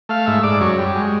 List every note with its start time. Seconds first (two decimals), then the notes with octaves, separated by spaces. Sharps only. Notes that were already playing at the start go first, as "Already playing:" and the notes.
0.09 A3 F5
0.26 G#2 E5
0.43 G#2 D5
0.60 F#2 C#5
0.78 G3
0.95 G#3